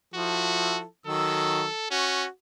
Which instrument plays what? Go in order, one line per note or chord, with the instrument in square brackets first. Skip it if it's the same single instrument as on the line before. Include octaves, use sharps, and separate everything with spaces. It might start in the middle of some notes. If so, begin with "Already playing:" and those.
[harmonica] F3 E4 A4 [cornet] F#4
[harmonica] D#3 F#3 E6 [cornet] A4
[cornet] C#4 [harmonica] F#4